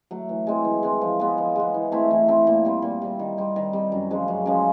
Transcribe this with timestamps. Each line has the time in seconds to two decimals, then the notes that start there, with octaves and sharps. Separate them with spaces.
0.11 F#3 A3
0.29 E3
0.47 G#3 C4
0.65 E3
0.83 G#3 C4
1.01 F3
1.20 G#3 B3
1.38 F3
1.56 G#3 B3
1.74 E3
1.92 A3 C4 E4
2.11 E3
2.28 A3 C4 E4
2.47 A#2
2.65 G3 C4
2.82 A#2
3.02 G3 C4
3.19 D#3
3.38 G3 C4
3.56 D#3
3.73 G3 C4
3.92 F#2
4.10 C#3 F3 G#3
4.28 F#2
4.46 C#3 F3 G#3